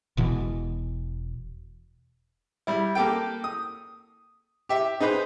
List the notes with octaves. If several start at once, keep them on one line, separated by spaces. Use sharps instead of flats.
E1 B2 E3
G3 E4
A#3 G4 A4 G5
D#6
G4 E5
D#4 G#4 B4 C5